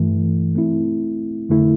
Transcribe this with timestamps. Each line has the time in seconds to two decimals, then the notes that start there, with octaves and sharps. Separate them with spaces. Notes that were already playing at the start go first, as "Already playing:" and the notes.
Already playing: G2 E3 A3
0.55 A3 C4 E4
1.49 F2 D3 A3 E4